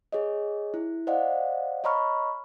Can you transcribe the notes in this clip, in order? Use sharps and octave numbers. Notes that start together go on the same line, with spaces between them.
G#4 C#5 D#5
E4
C5 D5 D#5 F5 F#5
C#5 D#5 A#5 B5 C#6 F6